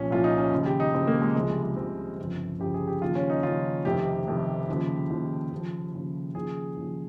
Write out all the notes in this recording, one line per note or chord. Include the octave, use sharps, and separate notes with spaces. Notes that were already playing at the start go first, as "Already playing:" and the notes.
Already playing: C2 A#2 F3 C#4
C2 A#2 F3 F4
D#4
C#4
D#2 C#3 F3
G4
D#4
D#2 C#3 F3 C4
A#3
G#3
C#2 C3 F3 G#3
G3
G#3
C#2 C3 F3 C4
G1 F2 C#3 F3
G1 F2 C#3 F3 G4
G#4
G4
D#2 C#3 F3 F4
C#4
D#4
D#2 C#3 F3 F4
F1 F2 C3 D#3 G4
F1 F2 C3 D#3
D#2 C#3 F3
D#2 C#3 F3
D#2 C#3 F3
D#2 C#3 F3
D#2 C#3 F3 G#4
D#2 C#3 F3